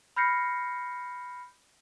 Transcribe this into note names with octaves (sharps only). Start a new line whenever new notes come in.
B5 F6 G6 A#6 C7 C#7